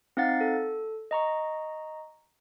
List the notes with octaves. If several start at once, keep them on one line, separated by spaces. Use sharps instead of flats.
C4 D#4 F5 F#5 A6
A4
D#5 A#5 C#6